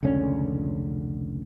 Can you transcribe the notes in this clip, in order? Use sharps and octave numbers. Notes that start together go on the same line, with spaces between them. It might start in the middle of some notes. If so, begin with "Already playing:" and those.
F1 C#2 D3 C#4